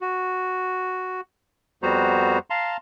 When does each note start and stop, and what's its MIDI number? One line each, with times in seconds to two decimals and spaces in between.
0.01 1.21 66
1.83 2.39 41
1.83 2.39 55
1.83 2.39 59
1.83 2.39 66
1.83 2.39 72
1.83 2.39 82
2.50 2.77 77
2.50 2.77 81
2.50 2.77 82
2.50 2.77 84